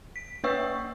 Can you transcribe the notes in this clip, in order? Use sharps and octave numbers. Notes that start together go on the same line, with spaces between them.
B6
A#3 B4 C#5 E5 C#6 E6